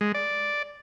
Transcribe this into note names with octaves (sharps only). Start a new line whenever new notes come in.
G#3
D5